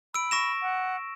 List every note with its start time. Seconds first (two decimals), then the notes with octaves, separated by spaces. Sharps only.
0.14 B5 E6 D7
0.31 C#6 A#6 E7
0.62 F#5